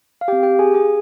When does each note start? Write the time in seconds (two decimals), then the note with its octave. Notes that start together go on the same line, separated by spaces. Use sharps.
0.21 F5
0.28 G4 G5
0.32 C4
0.43 G4 G5
0.59 G#4 G#5
0.74 G#4 G#5